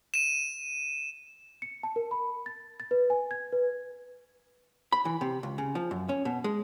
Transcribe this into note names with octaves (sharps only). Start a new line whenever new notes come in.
D#7 E7
C#7
A5
A#4
B5
A6
A6
B4
G#5
G#6
B4
B5
E3
C3
C#2
C#3
F3
F#2
C#4
B2
G#3